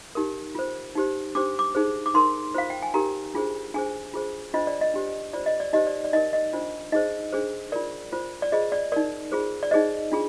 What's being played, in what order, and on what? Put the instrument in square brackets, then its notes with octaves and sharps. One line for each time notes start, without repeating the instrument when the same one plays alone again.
[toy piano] D#4 G4 A#4
F4 C5
D#4 G4 C5
D4 G4 C5 D6
D6
D#4 G#4 C5
D6
D#4 A#4 C6
F4 C5 F5
G5
G#5
D#4 G4 A#4 A#5
D4 F4 G#4 C5
D4 G#4 C5 G#5
F4 G#4 C5
D4 F4 C5 D#5
D5
D#5
D4 G4 C5
F4 C5 D5
D#5
D5
D#4 G4 C5 D#5
D5
D5
D#4 A#4 D#5
D#5
D4 F4 C5
D#4 G#4 C5 D#5
D4 G#4 C5
F4 A#4 D5
F4 C5
D5
F4 G#4 C5 D#5
D5
D#4 A#4 D5
F4 G#4 C5
D5
D#4 G#4 C5 D#5
D4 F4 G#4